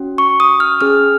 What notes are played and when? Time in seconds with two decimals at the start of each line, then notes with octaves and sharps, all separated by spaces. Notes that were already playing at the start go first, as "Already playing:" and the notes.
Already playing: C#4 F#4
0.18 C#6
0.40 D#6
0.60 F6
0.81 C#4 G#4 F6